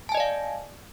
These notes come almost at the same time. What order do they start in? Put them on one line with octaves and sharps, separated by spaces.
A5 G#5 D#5 D5 F5